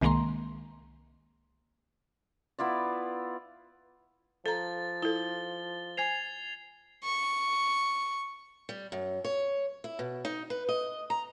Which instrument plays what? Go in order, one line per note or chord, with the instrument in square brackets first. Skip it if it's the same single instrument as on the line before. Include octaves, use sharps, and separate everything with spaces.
[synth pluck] C2 D#3 G#3 A#3 A#5 C6
[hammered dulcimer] B3 E4 F4 D5
[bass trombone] F3 [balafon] A4 A#5 [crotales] A6
[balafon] E4 A4 [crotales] G7
[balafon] C5 G#5 [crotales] G#6 C7 F7
[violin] C#6
[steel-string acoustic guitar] G3
F#2
C#5
E4
B2
D#4
B4
D#5
A#5